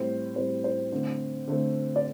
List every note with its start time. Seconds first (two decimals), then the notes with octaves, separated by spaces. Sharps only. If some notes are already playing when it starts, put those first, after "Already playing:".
Already playing: A2 G3 C4 C5
0.36 A2 G3 C4 C5
0.64 C5
0.92 D3 A3 C4
1.47 D3 A3 C4
1.96 D5